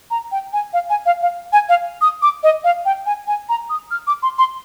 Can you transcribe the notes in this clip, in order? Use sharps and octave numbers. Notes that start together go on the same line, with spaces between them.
A#5
G5
G#5
F5
G#5
F5
F5
G#5
F5
D#6
D6
D#5
F5
G5
G#5
G#5
A#5
D#6
F6
D6
C6
C6